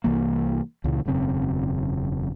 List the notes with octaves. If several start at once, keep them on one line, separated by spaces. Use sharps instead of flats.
C2 E3 A#3
C#2 A#2 C#3 E3
E1 F#2 C#3 C4